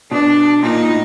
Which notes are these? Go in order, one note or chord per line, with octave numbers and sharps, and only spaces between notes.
B2 D4
A#2 D#4
A2